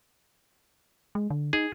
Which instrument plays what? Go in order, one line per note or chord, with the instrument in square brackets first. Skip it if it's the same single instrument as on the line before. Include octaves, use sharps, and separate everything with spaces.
[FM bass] G#3
D3
[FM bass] D#4 [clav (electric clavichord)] G#4